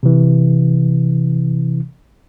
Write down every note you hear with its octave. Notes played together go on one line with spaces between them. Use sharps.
C3 E3